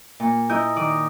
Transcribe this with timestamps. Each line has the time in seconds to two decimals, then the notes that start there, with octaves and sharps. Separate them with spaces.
0.20 A#2
0.49 E4 A#4 D#5 D#6 G6
0.76 D#3 D5 D#6